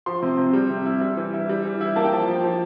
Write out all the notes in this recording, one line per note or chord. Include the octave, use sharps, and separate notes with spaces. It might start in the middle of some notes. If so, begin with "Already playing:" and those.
F3 C6
C3
C3
G3
C3
E4
G3
E3
E4
G3
E3
E4
A#3 A5
G5
F3 A5
F3
F3